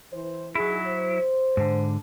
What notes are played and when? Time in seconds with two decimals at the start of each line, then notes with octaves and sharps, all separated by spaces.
0.12 E3 C5
0.55 F#3 D#4 E4 G#4
0.86 C5
1.57 G#2 D3